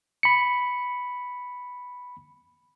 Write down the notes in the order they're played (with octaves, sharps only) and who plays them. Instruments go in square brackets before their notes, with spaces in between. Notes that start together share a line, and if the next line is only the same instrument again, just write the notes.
[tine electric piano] B5 C#7